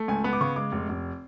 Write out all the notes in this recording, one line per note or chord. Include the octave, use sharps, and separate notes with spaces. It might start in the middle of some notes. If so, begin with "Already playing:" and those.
Already playing: A3
C#2 G#5
B3 B5
D6
C#3 C#6
G#3 D6
F1
F1